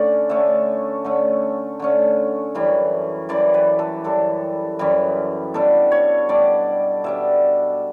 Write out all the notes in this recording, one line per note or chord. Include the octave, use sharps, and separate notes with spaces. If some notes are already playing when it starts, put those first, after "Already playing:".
Already playing: D3 A3 C#4 D5
D3 A3 C#4 E5
D3 A3 C#4
D3 A3 C#4
F#2 E3 G3
F#2 E3 G3 D5
B4
A4
F#2 E3 G3 A4
F#2 E3 G3
B2 G3 D4 A4
C#5
B2 G3 D4 D5
B2 G3 D4 E5